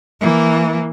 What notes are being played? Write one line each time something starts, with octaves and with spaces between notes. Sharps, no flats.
E3 A#3